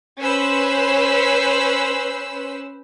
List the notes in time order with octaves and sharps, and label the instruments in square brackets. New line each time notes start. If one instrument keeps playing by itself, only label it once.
[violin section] C#4 B4 C5 E6